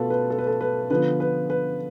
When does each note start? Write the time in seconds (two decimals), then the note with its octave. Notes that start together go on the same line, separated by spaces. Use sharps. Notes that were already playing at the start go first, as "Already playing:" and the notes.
Already playing: B2 A3 F4 A4 B4
0.10 B4
0.30 A4
0.38 B4
0.47 A4
0.61 B4
0.90 D3 F3 B3 B4
1.20 B4
1.50 B4